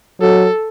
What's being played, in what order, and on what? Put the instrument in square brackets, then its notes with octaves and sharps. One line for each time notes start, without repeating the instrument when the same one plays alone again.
[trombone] F#3 [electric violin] A4